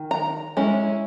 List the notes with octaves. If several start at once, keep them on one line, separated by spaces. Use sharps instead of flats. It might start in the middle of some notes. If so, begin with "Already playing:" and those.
Already playing: D#3
A#5
G#3 C#4 E4